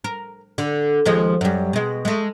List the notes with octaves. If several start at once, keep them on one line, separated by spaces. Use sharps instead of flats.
A#4
D3
D#2 F3 G#3
F#2 G3
B2 G#3
G#3 A3